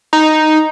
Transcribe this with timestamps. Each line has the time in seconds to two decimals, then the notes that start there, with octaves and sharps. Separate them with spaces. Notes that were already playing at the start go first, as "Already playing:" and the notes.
0.13 D#4